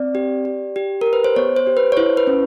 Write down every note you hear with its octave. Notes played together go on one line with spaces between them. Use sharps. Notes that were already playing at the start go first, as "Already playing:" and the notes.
Already playing: C4 D5
G4
G4
G4
G4 A#4
B4
C5
B3 C#5
C5
G4
B4
C#5
E4 C5
B4
C#4